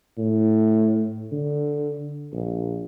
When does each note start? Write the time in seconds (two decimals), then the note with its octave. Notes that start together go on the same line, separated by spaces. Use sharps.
0.18 A2
1.32 D3
2.33 A#1